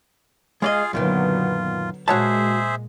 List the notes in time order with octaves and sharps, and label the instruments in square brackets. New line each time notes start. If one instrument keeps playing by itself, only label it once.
[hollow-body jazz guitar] G#3 D5 D#5 [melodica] F4 G#4 F5
[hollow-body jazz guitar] F#2 A#2 D#3 [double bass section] D3 F#3 B3 [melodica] F4
[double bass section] A#2 G#3 [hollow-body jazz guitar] F#4 C#5 A5 [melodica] G#4 C5 E5